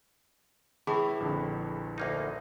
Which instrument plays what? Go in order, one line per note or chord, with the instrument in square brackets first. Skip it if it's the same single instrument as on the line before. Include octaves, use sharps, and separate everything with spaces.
[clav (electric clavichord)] A2 [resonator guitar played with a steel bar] E3 [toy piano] G#4
[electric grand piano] A#1 F2 D3
[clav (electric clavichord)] D2 A#3 D#4